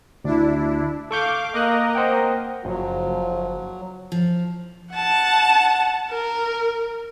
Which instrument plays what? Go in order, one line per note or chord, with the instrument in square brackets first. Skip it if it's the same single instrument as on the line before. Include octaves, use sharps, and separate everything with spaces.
[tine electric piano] D2 [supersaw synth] D4 E4
[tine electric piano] A4 C#6 G6 [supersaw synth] F5 D6
[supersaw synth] A#3 A#4 D#5 [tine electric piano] F5 D6 F#6
[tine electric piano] C5 F#5 G5
[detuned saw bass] F#1 [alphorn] F3 [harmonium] F#3
[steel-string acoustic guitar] F3
[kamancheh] F#5 A5
A#4